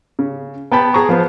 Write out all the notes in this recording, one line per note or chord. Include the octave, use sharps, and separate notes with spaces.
C#3
B3 G5 A5 B5
G#4 A5 A#5 C#6
F3 B3 C5